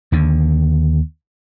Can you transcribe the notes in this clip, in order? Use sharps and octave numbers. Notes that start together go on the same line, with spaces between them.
D#2 D3